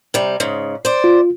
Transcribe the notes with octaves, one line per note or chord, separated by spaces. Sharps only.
C3 G3
G#2 C#3
C5 D5
F4